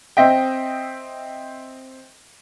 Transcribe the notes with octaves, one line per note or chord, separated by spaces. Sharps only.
C4 D#5 E5 G5